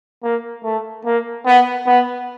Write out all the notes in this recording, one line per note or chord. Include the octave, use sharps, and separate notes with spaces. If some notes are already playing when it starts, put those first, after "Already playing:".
A#3
A3
A#3
B3
B3